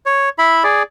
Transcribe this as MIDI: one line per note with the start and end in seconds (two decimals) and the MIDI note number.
0.06 0.29 73
0.38 0.63 64
0.38 0.63 76
0.38 0.63 83
0.64 0.83 68
0.64 0.83 74